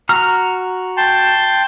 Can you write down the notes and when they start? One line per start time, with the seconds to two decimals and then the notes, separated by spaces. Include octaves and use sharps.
0.09 F#4 A#5 F6
0.97 G5 A5 C6